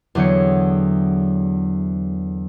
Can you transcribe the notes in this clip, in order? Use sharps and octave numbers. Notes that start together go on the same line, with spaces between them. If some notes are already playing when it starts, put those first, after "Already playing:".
E2 D3 F#3 G#4 G5 C#7